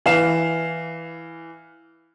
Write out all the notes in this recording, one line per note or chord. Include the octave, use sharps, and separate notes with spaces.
E3 F5 E7